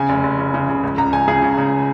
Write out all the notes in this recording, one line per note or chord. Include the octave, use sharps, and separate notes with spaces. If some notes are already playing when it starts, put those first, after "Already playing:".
Already playing: C#3 G#5
F1
F1
C#3
C#3
C#3
C#2
C#2 A#5
C#2 G#5
C#3 G#4
C#3
C#3